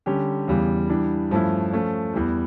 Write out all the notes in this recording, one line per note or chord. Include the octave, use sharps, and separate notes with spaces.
D3 G3 C#4 G4
E2 C#3 E3 G3
E3 G3 D4
G2 F3 A3 C#4 E4
F3 A3 C#4
E2 E3 G3